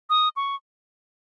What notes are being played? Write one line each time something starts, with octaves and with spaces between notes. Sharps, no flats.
D#6
C#6